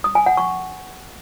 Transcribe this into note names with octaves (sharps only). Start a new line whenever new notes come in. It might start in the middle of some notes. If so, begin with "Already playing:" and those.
D#6
G#5
F#5
C#6